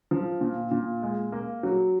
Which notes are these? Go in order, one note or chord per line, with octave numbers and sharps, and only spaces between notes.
F3
A#2
A#2
G#3
A#3
F#3